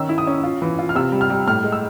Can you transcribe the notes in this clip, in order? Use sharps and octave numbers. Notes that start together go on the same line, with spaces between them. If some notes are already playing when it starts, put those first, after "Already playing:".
Already playing: D#3 C#4 E6
E4
D#6
C#4
F4
E3
F4
F6
C3 E6
G3
F6
G3
A2 F6
G#3
E6